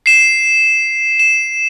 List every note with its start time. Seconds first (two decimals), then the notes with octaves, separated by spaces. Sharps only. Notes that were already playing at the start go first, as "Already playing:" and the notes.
0.06 C7 E7
1.19 E7